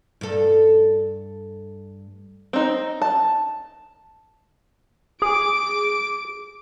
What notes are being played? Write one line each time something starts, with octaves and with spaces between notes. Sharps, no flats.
G2 A4
C4 D#4
A5
G#4 D6 D7